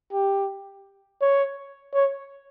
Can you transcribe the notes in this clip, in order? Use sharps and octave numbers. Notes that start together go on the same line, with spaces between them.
G4
C#5
C#5